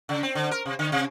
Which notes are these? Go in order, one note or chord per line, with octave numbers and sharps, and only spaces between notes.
C#3
C4
D3
A#4
C3
D3
C3